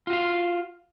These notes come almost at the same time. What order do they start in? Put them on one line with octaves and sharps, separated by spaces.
F4 F#4 F5